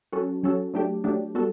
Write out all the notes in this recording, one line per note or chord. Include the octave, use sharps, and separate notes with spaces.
F#3 C#4 F#4 A4
F#3 C#4 F#4 A4
F#3 A3 D4 G4
F#3 A3 D4 G4
G3 B3 F#4 A4